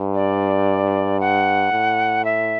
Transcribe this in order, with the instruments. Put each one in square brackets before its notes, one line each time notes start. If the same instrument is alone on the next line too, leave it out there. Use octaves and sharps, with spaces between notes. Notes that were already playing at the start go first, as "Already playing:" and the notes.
Already playing: [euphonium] G2
[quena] D5
F#5
[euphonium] A2
[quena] E5